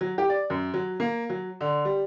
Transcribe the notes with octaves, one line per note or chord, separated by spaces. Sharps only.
F#3
G4
D5
F#2
F#3
A#3
F#3
D3
G3